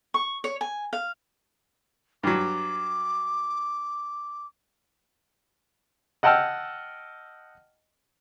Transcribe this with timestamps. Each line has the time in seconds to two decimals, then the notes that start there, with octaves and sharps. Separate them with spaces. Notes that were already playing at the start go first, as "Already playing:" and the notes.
0.14 C#6
0.44 C#5
0.61 G#5
0.93 F5
2.23 G2 F#3 D6
6.23 D#5 F#5 G5 A5 E6 F6